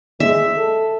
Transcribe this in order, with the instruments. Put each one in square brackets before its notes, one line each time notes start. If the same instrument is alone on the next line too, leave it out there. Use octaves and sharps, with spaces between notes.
[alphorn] G#3 [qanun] E5
[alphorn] A4